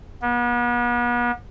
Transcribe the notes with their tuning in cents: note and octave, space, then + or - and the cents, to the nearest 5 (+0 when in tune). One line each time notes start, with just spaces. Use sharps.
B3 -40